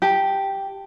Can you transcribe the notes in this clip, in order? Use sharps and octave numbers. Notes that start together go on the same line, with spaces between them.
G4 A5